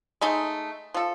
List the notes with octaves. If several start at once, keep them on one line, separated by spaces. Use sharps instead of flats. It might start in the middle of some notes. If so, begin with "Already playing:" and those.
G#3 A3 D#4
F3 A4